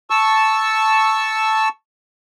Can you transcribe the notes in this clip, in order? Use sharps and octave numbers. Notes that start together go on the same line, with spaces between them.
A5 C#6 E6